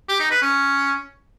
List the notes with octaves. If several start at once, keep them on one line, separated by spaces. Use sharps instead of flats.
G4
D#4
B4
C#4